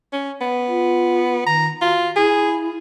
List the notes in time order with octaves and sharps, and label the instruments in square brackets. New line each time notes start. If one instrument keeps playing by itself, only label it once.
[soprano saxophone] C#4
B3
[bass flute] F4
[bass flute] D#3 [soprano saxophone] A#5
[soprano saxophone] F4 [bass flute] F#4
[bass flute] E4 [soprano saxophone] G#4